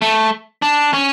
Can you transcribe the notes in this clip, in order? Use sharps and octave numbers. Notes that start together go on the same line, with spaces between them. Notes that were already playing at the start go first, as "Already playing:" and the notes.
A3
D4
C#4